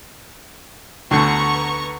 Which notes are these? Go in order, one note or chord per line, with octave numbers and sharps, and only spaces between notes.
D2 D3 B3 A#5 C#6